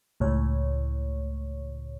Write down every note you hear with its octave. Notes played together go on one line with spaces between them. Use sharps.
C#2 A2 C#5